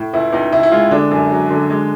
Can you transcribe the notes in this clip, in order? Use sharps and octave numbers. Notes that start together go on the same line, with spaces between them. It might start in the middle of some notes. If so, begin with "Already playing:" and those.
Already playing: A2
C#2 E4
C#2 D#4
C#2 E4
E4
G#3 F4
D3 D4
F#2
F#3
D3
G#3